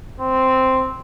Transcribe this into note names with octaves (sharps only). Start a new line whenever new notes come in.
C4